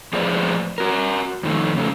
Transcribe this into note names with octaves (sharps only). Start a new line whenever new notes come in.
F3 A3 G#4 B4 C5 D5
F#4 A#4
F2 D#3 A3
C#3 A3